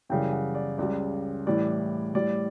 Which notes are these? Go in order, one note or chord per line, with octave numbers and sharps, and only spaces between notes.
F#2 C#3 E3 G3 G5
F#5
D5
C#2 C#3 G3 D5
A2 E3 G3 D5
A2 G3 D5